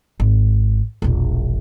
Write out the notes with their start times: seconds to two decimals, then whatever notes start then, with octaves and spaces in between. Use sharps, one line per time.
0.20 G#1
1.02 E1 A#1